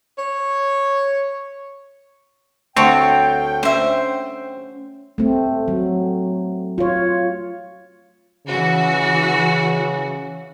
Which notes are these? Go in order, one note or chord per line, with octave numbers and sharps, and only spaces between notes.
C#5
D2 C4 C#5 F#5 G5 A5
C#4 C5 E5
A3 C4
F#3
F4 C#5
C#3 E3 F#4